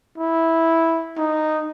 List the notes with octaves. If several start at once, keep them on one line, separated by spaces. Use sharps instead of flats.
E4
D#4